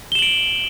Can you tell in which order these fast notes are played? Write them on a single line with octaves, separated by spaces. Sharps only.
G7 E7 F#7 D7